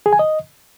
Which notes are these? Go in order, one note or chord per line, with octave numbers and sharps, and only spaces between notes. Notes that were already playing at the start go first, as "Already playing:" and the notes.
G#4
G#5
D#5